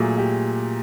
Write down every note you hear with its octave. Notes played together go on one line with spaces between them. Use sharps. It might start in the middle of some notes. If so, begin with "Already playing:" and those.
Already playing: A#2 F#3 A3 G#4
G4